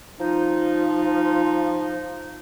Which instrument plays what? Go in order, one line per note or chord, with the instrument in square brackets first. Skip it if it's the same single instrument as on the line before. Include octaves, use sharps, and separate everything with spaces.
[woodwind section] F3 D#4